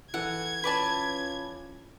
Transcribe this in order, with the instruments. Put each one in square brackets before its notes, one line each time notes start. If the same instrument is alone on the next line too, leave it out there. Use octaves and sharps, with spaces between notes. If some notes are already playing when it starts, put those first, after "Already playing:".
[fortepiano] E3 A4 [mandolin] F#5 [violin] G#6
[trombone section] C#4 F4 [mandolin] B4 D5 A5